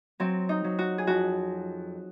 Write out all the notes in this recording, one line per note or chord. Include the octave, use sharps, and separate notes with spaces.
F#3 C4
D#4
F#3
F#4
G#4
F2 F#4